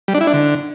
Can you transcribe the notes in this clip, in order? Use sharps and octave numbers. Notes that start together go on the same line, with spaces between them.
G3
D4
E4
D4
D3